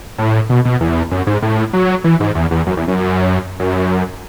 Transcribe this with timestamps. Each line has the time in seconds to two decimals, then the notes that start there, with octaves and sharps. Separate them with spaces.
0.18 A2
0.49 B2
0.65 B2
0.81 E2
1.11 F#2
1.27 G#2
1.42 A2
1.73 F#3
2.04 E3
2.20 G#2
2.35 E2
2.51 E2
2.67 F#2
2.77 E2
2.88 F#2
3.60 F#2